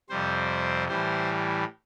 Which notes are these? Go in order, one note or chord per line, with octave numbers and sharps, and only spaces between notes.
F2 C3 G3 C5
A2 E3 G3 C5